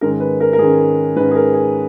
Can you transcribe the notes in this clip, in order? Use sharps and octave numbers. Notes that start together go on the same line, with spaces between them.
G#2 D#3 G#3 C#4 A#4
B4
A#4
A#4
G#2 D#3 G#3 C#4 G#4
G#2 D#3 G#3 C#4 B4
G#4
A#4
G#4